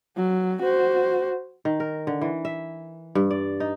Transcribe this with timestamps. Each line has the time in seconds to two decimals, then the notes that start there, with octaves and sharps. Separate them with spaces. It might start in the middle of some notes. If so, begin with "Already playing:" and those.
0.17 F#3
0.62 F#4 C5
1.65 D#3
1.80 A#4
2.07 D3
2.22 E3
2.45 E5
3.15 G2
3.31 D5
3.60 D#4